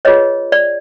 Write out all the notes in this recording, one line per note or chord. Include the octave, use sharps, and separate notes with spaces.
F4 G#4 B4 C#5 D#5
D5